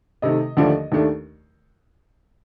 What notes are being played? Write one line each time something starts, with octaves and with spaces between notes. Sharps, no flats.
C3 D#3 A3 D#5
D#2 D3 F3 A3 D4
D#2 D#3 A3 D4